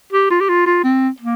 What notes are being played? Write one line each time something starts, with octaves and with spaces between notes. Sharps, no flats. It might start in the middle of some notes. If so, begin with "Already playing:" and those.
G4
F4
G4
F4
F4
C4
A#3